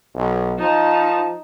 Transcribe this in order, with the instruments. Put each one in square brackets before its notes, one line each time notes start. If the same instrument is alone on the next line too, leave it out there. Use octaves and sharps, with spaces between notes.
[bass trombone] B1
[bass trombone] F3 [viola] D#4 A5